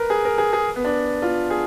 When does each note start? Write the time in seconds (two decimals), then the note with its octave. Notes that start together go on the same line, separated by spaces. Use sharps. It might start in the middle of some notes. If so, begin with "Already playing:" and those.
Already playing: A#4 B4
0.10 G#4
0.25 A#4
0.38 G#4
0.53 G#4
0.76 B3
0.85 D4
1.22 F4
1.50 G#4